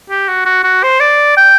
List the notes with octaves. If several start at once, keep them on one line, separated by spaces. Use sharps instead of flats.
G4
F#4
F#4
F#4
C5
D5
G5